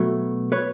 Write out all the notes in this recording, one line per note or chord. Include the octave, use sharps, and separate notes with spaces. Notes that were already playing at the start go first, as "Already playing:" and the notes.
Already playing: B2 F#3 A3
B4 C#5